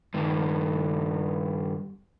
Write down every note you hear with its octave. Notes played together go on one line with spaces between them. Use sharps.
G2 D#3